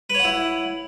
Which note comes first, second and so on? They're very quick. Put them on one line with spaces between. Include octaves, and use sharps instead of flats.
B4 C#5 F#5 E4